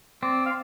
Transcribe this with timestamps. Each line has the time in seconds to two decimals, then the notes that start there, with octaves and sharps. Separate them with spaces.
0.23 C4 D5
0.46 F5